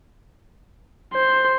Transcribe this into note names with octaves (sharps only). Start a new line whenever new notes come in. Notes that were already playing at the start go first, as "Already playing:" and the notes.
C5